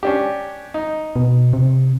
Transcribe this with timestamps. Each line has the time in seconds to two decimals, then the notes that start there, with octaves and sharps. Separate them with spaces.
0.03 C#4 D4 G4
0.74 D#4
1.16 B2
1.53 C3